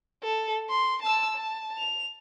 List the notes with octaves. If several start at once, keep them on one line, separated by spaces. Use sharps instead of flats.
A4
C6
A5 E6
A5
F7